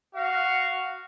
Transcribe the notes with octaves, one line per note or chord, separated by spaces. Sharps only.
F#4 F5